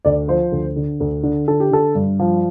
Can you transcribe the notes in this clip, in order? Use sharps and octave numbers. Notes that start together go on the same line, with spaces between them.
D2 D5
F3 C5
D2
D3
D2
D3
D3 A4
G4
D3 A4
G2
F3